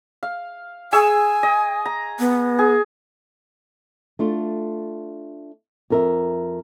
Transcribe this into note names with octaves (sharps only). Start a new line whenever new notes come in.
F5
G#4 G#5 C#6 E6
D#5
A#5
B3
G#4
A3 D4 F4
F2 A#4 E5